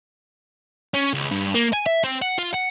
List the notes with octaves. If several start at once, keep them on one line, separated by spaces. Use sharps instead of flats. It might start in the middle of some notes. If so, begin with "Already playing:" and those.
C#4
C#2
G2
A#3
G#5
E5
C4
F#5
F4
F#5